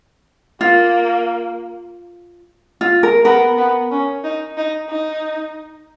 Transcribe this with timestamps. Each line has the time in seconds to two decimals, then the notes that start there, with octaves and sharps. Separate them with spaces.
0.61 A#3 F4
2.81 F4
3.03 A#4
3.25 B3 A#4
3.58 B3
3.91 C#4
4.24 D#4
4.57 D#4
4.90 D#4